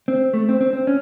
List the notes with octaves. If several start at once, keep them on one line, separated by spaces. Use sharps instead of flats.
C4
A3
C4
C4
C4
C#4